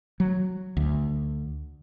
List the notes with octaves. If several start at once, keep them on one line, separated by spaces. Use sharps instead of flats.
F#3
D2